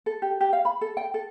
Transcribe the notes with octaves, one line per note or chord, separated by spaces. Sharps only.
A4
G4
G4
F5
B5
A4
G5
A4